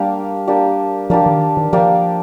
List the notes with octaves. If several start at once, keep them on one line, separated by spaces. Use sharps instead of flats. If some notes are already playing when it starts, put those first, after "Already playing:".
Already playing: G3 A#3 D4 G4
A#3 D4 G4
F3 A#3 D4 G4
D#3
D#3
F3 A#3 D4 G4